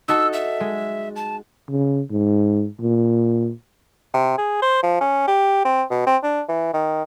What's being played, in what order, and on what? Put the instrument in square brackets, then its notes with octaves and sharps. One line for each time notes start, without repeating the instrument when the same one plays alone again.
[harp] D#4 F#4 A4 [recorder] E6
[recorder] E5
[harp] G#3
[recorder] A5
[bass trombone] C#3
G#2
A#2
[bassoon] C3
G#4
C5
F3
C#4
G4
C4
B2
C4
D4
E3
D#3